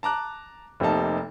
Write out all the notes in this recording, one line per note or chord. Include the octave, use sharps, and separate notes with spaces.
A5 A#5 D6 F#6
F1 C3 A#3 D#4 A5